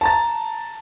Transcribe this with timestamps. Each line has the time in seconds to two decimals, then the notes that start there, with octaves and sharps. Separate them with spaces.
0.01 A5 A#5 A6